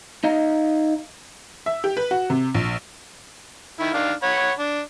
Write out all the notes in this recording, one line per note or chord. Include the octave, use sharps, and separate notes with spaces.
D#4 D#5 F5 A#5
E5
G4
B4
F#4
C3
A#1
D#3 E4
D#3 D4 F5
C#5 F#5 B5
D4